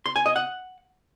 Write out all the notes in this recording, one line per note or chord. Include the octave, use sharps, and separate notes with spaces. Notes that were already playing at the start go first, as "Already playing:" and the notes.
C6
G#5
D#5
F#5